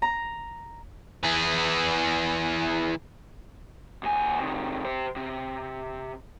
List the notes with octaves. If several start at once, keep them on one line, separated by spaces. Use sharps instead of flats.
A#5
E3 G#4
D#2 G#5
C3 D#3
G4 C5
C3